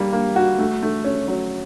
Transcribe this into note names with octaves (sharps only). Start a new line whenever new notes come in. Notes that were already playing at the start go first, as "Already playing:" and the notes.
Already playing: G3 A#3
A#3
F#4
A3
A3
C#4
F#3